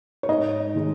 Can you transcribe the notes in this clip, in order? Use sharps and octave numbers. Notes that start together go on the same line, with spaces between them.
C#5
G#2 D#5
D#3 G#3